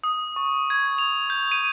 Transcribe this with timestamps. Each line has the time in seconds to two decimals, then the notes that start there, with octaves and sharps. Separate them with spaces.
0.04 D#6
0.36 C#6
0.70 G#6
0.98 F7
1.30 G6
1.52 D#7